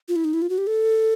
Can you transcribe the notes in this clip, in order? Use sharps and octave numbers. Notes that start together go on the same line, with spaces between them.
F4
E4
D#4
E4
F4
F#4
G4
A4